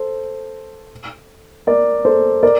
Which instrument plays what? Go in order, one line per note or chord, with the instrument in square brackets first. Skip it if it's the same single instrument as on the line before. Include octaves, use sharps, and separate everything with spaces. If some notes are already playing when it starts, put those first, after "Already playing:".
Already playing: [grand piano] A4 C5
A#4 D5
A4 C5
A#4 D5